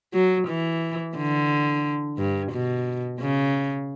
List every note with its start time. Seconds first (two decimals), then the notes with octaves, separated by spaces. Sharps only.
0.14 F#3
0.48 E3
1.17 D3
2.18 G2
2.52 B2
3.21 C#3